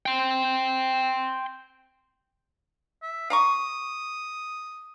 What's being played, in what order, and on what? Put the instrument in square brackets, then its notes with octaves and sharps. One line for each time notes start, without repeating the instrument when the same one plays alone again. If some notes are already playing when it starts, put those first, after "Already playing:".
[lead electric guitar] G5 C6
[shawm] E5
[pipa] F5 A#5 C#6 [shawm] D#6